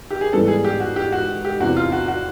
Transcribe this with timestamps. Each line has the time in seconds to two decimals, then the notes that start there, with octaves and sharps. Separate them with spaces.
0.11 G4
0.21 G#4
0.33 G#2 E3 G3 B3 A4
0.48 G#4
0.64 G4
0.80 F#4
0.96 G4
1.12 F#4
1.45 G4
1.60 E2 C3 E3 F#4
1.77 F4
1.92 F#4
2.08 F#4